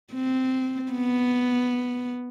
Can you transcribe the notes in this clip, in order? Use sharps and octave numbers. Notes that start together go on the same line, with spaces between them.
C4
B3